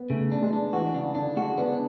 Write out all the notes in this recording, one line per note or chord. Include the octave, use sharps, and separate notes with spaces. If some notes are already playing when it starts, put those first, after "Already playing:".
Already playing: B3
C#3 A3
D4
G#3
D4
E3 F#4
C#3 D4
D3 D4
G#3 F#4
B3 D4